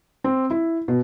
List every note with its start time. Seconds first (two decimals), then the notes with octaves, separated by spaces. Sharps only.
0.24 C4
0.50 E4
0.88 B2